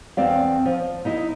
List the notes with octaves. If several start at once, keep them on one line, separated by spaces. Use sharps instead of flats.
E2 C4 D5 F5
F3
D#4 E4 D#5